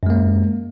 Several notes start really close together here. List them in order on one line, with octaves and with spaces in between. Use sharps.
F#2 G#3 A#3